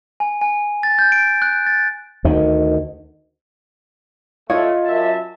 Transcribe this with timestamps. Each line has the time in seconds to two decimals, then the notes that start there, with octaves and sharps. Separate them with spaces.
0.20 G#5
0.41 G#5
0.83 A6
0.99 G6
1.12 D7
1.42 F#6
1.67 A6
2.25 D2 D#3
4.50 A3 F4 C#5 D#5
4.85 F#2 E5 A5